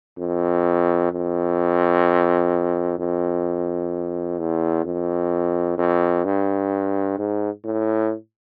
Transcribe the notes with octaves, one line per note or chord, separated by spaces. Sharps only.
F2
F2
F2
E2
F2
F2
G2
G#2
A2